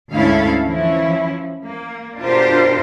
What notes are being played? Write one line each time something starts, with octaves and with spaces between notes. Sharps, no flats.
D2 G#2 C#4 E4 A4 F5
E3 F3 C#4 E4
A#3
B2 D4 F4 G4 A#4 C5